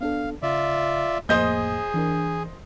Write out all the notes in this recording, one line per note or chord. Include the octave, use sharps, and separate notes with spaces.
B3 D4 A4 F5
C#3 F4 D5 E5
F2 A2 A#3 G#4 C5 D#5 G6
E3 D4 A#4